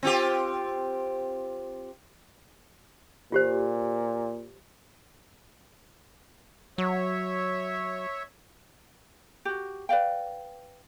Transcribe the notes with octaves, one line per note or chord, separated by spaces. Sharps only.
C4 F4 G4
A#2 F4 G4 C5
F#3 C#5 E5
F#4 G4
B4 D5 F5 G5